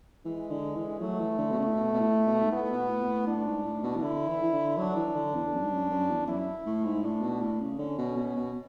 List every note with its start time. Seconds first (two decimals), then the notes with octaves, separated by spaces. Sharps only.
0.25 E3 G#3
0.50 D3
0.75 E3
1.00 F#3 A3
1.20 E3
1.38 D3
1.51 B2
1.57 C#3
1.67 A2
1.76 B2
1.93 B2
2.01 A2
2.26 B2
2.41 G#2
2.51 A2 B3
2.70 B2
2.89 A2
3.03 B2
3.07 A2
3.27 A2 D4
3.45 G#2
3.64 A2
3.83 B2
3.96 E3
4.02 D3 E4
4.28 E3
4.42 E3
4.53 D3
4.77 F#3 D4
4.96 E3
5.15 D3
5.34 E2
5.53 F#2
5.64 G#2
5.72 F#2
5.90 F#2
6.10 E2
6.28 F#2 E4
6.66 A2
6.84 G#2
7.03 A2 D4
7.22 B2
7.41 A2
7.60 C#3
7.79 D3 C#4
7.98 B2
8.16 B2
8.36 B2